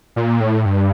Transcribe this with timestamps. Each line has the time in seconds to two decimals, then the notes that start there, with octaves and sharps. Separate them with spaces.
0.16 A#2
0.40 A2
0.66 G2